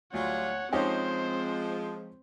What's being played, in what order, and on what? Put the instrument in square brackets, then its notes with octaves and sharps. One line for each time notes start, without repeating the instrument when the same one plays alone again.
[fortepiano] D2 [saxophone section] F#3 G3 F4 [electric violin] C#5 F#5
[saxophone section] F3 G#3 [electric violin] C4 C5 [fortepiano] C#4 D#4 G4